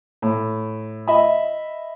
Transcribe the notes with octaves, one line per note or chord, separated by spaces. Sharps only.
A2
D#5 E5 B5